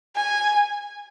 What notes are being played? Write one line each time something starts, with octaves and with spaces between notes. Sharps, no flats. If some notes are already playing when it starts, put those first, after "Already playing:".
G#5